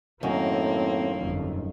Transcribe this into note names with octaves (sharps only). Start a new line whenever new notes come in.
F#2 A2 D#3 A#3 C4
G1 F2